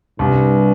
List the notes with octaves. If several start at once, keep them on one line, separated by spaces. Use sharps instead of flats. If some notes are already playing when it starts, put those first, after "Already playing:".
C2 G2